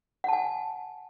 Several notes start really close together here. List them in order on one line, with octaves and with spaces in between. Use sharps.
F#5 A5 G#5